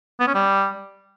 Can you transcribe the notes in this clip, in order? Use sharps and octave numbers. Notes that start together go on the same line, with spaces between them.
B3
C#4
G3